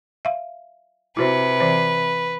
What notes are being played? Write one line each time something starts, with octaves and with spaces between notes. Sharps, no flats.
E5 F5
C3 E4 F#4 B4 C5
E3 C5